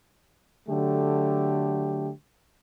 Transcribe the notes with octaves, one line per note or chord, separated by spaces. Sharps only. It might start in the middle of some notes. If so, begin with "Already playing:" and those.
D3 F#3 A3 G4